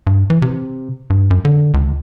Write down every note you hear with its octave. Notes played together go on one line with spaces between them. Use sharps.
G2
E3
C3
G2
F#2
D3
C#2